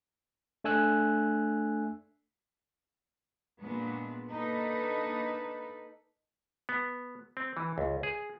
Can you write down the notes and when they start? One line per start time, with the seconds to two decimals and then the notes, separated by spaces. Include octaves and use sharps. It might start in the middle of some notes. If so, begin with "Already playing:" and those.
0.64 A3 D4 G#5 E6 F#6
3.60 A#2 G#3 B3 D4
4.28 A#3 D4 D#4 A4 B4
6.69 B3
7.37 C4
7.57 E3
7.78 C#2
8.03 G#4